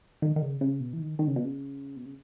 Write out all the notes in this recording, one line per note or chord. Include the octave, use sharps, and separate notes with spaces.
D#3
D#3
C#3
C#3
B2
E3
D#3
D#3
C#3
B2
C#3
B2
C#3